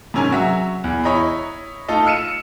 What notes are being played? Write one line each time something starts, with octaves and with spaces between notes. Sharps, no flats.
G#2 C3 C#4 A#4 G#5
F#3 F#4 E5
E2
E4 C#5 D#5 A#5 B5
A3 D#4 F4 A4 D#5
E6 F6 C#7 D#7 E7